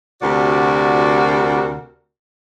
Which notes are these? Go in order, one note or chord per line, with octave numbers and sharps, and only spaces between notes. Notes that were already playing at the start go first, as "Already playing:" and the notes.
D2 C3 F#4 A#4 D5